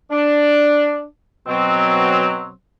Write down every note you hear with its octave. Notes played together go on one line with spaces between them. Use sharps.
D4
B2 F#3 C4